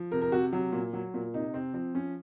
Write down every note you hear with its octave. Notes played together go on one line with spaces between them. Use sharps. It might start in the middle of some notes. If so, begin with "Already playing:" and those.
Already playing: F3
C3 A#4
A#4
C3 F#4
F#3
A#2
F#3
A#2
C3 D#4
C3 C4
F3 C4
F3 C#4